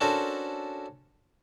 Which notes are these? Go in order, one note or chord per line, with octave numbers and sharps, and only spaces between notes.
C#4 D4 F#4 A4 A#4 C5